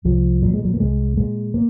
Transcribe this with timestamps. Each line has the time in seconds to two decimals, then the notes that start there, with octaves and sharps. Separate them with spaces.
0.05 C2 F3
0.42 A#2 F#3
0.54 G#3
0.65 F#3
0.74 A#3
0.79 C2 G#3
1.16 A#2 G#3
1.54 A#3